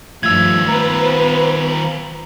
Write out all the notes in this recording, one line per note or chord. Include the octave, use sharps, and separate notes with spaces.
G2 D#3 F3 A3 F4 E6 G#6
B3 B4 C5 A#5